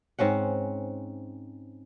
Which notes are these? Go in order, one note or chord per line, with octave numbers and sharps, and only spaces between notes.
G#2 C4 C#4 F#5